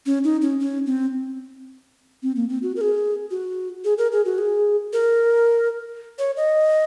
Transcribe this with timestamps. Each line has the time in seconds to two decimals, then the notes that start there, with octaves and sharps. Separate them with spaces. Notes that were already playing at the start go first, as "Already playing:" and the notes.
0.06 C#4
0.24 D#4
0.42 C#4
0.60 C#4
0.86 C4
2.23 C4
2.36 A#3
2.49 C4
2.63 F#4
2.76 A#4
2.81 G#4
3.31 F#4
3.85 G#4
3.98 A#4
4.12 G#4
4.25 F#4
4.38 G#4
4.93 A#4
6.19 C#5
6.37 D#5